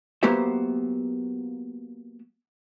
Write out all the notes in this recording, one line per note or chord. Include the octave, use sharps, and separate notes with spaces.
F#3 A#3 B3 G4 C5 E5